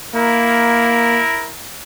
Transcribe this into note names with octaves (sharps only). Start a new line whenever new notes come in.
A#3 E4 A#4